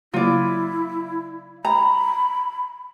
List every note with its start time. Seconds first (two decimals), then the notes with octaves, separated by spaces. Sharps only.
0.14 C#3 F#3 A#3 E4 F4 D5
1.65 A#5 B5